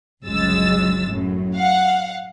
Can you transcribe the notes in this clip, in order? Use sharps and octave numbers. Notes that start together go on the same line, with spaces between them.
G1 C#2 F#3 G#3 E6 A6
F#2 A2
F5 F#5